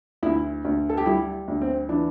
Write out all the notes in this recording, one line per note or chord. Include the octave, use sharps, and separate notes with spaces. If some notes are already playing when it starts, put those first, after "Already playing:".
D2 E4
D2
A4
G4
G3 E4
D2
C4
E3 D4